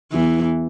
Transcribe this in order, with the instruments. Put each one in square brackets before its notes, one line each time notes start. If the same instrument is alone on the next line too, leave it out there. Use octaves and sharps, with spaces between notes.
[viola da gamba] E2 E3